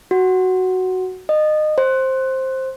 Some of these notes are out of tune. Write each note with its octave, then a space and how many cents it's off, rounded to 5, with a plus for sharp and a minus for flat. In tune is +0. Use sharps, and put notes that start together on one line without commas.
F#4 +5
D#5 -25
C5 +10